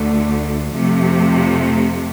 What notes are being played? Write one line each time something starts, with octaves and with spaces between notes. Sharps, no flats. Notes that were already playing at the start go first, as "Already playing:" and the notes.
Already playing: D2 D3 A3
F2 C3 F3 A3